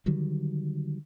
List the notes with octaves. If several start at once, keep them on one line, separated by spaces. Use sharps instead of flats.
D3 D#3 F#3 G3